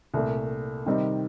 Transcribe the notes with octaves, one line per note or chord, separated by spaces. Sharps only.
C2 A#2 A3
C3 D#3 G3 C4 D#4